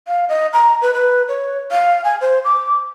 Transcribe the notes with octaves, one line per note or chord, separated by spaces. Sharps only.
F5
D#5
A#5
B4
B4
C#5
F5
G#5
C5
D6